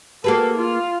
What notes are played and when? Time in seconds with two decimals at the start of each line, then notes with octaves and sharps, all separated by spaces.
0.24 A#3 F#4 G#4 A4 B4
0.57 F4 F5